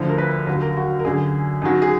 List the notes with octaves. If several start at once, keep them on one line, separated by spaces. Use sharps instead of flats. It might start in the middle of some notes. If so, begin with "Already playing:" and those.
Already playing: D2 D3 F3
A#4
B4
D#2 D3 F#3 B4
A#4
F#4
A#4
F#2 D3 F#3 G#4
F#2 D#3 F#3
G#4